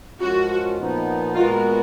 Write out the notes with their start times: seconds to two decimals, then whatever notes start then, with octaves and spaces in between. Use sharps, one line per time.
0.20 F#2 F3 G#3 C#4 F4 F#4
0.77 A#2 F3 B3 D#4
1.34 A#2 G#3 B3 F4 F#4 A#4